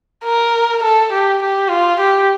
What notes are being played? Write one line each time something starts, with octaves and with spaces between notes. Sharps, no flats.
A#4
A4
G4
G4
F4
G4